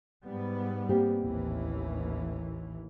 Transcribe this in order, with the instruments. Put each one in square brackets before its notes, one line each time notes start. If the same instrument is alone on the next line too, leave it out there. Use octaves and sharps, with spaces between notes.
[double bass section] G#2 G3 B3
[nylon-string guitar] A#3 C4 G4
[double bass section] A1 D#2 E3